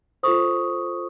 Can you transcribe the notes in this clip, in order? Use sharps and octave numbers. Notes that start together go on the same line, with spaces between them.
F4 A4 C5 C#6 D#6